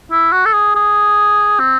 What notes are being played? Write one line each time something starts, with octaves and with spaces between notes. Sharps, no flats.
E4
F#4
A4
G#4
G#4
C4